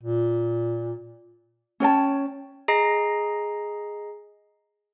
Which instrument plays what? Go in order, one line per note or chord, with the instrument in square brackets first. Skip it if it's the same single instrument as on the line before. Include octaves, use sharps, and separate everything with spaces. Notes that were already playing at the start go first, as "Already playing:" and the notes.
[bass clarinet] A#2
[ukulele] C#4 C#5 G5 A5
[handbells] G#4 D#5 A#5 C7